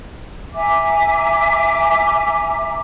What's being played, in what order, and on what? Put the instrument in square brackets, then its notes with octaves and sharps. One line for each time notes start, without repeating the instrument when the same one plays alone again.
[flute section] E5 G#5 A#5 D6